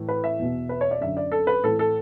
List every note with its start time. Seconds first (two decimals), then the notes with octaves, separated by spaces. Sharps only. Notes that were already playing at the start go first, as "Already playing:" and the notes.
Already playing: A2 E3
0.09 B4
0.24 E5
0.39 E2 B2
0.69 B4
0.81 C#5
0.91 D5
1.01 F#2 D3 E5
1.17 D5
1.32 A4
1.47 B4
1.63 A2 E3 A4
1.79 A4